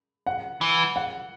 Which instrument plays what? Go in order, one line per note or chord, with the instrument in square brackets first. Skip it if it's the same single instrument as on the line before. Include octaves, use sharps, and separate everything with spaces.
[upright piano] F#5
[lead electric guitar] E3
[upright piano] F#5